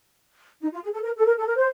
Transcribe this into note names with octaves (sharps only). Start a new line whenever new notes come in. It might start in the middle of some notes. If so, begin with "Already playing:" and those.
D#4
F4
G#4
A4
A#4
A4
A#4
A4
A#4
C5